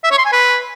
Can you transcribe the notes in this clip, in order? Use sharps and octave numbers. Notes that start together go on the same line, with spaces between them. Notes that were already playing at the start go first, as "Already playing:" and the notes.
E5
C#5
C6
G#5
B4